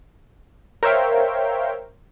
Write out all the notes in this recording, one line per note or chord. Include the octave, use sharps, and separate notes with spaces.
A#4 C5 C#5 E5 F5 G5